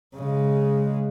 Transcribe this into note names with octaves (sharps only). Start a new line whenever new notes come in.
C#3 G#3